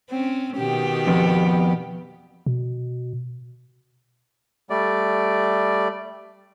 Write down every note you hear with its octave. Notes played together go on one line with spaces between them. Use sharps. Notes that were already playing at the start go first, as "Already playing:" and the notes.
C4 C#4
B2 D#3 G4
F2 B3
B2
G3 A3 D5